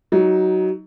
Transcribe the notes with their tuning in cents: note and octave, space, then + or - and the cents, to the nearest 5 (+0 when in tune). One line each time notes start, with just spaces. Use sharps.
F#3 +15 D#4 +20